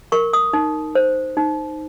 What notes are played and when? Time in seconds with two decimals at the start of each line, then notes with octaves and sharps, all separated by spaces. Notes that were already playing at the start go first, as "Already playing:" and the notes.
0.12 A#4 C#6
0.33 D#6
0.53 D#4
0.95 C5
1.37 D#4